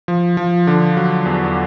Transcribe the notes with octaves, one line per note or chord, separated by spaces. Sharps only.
F3
F3
D3
F#3
E2